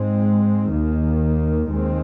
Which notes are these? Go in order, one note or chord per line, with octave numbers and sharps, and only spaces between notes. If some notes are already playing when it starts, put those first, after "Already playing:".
Already playing: G#2 G#3 C4
D#2 D#3 A#3
D#2 D#3 G#3 C4